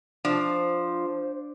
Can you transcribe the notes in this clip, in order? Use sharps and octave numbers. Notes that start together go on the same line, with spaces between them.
F3 D4 C5